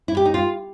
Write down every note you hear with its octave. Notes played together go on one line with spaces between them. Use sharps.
E4
G4
D#4
F4